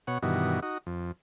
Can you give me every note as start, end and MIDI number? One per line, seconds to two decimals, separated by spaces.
0.07 0.18 47
0.07 0.18 73
0.07 0.18 78
0.22 0.60 43
0.22 0.60 47
0.22 0.60 51
0.22 0.60 52
0.22 0.60 66
0.62 0.78 63
0.62 0.78 66
0.87 1.12 41